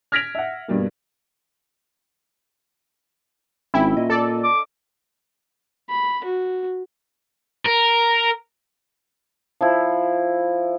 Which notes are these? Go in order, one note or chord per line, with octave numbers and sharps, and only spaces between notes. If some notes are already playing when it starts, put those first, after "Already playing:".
F6 G#6 A#6 B6 D7 F7
E5 F#5
G2 B2 G3 A#3
G#1 C#4 E4 G5
A#2 D#5
A4 D5
D6
B5
F#4
A#4
F3 E4